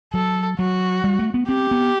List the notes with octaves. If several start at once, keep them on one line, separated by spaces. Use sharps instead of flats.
F#3 A4
F#3 F#4
G3
A3
B3
C4 G4
B3